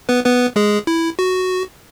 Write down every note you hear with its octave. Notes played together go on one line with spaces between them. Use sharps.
B3 B4
B3 B4
G#3 G#4
E4
F#4